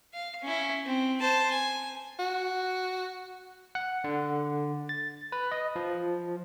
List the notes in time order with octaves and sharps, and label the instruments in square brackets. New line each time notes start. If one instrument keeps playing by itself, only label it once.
[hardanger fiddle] F5
C#4 E4
C4
C5 A5
G#5
[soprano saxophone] F#4
[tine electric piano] F#5
D3
A6
B4
D#5
F3